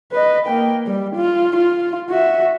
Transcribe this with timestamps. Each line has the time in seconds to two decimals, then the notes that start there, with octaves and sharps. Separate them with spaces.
0.12 B4 D#5
0.47 A#3 G5
0.87 G3
1.15 F4
1.56 F4
2.09 F#4 E5